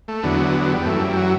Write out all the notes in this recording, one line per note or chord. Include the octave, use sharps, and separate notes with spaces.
A3
E2 D3 F#3 B3
F#3
G3
F#2 E3 A3
G3
F#3